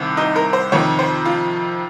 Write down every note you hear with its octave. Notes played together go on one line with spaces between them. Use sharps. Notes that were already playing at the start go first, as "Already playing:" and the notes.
Already playing: C2 C3 D#3
D#4
A#4
C5
F2 C3 D#3 C#5
C5
F4